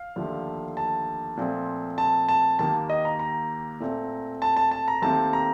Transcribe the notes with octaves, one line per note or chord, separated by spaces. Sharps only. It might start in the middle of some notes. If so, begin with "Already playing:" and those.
Already playing: F5
D#2 D3 F3 A3
A5
A#2 F3 A3 C4
A5
A5
D#2 D#3 A#3 A5
D#5
A#5
A#5
A#2 A3 C4
A5
A5
A5
A#5
D#2 D#3 A3 C4 A5
A#5